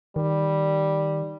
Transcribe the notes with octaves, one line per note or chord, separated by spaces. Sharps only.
D#3 G3